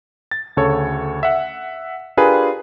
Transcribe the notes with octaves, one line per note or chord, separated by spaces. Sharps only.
A6
D2 C#3 A4 C#5
E5 F#5
D4 F4 G4 G#4 A#4 B4